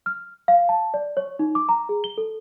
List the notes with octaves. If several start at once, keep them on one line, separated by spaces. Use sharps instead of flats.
F6
F5
A5
D5
C#5
D#4
D6
A#5
G#4
G7
A4